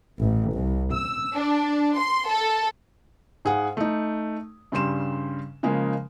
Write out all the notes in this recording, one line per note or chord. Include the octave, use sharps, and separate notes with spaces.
A1
C2
E6
D4
C6
A4
G#2 G#4 F5 F#5
A3 D#4
G2 C#3 G3 C6 E7
C#3 F3 G#3 A#3